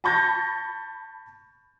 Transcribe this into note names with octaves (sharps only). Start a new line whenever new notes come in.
A5 B5 C#6 G6 A6 A#6